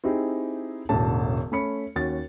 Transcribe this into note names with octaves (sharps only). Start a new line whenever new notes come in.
C4 D#4 E4 G4 G#4
E1 A1 D3 F#4 A5
A3 C#4 B5 C#7
D#2 C#4 F#4 A6